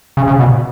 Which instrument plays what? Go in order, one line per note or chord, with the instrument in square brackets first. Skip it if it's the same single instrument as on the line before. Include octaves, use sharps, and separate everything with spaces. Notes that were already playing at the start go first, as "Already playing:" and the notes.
[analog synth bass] C#3
C#3
B2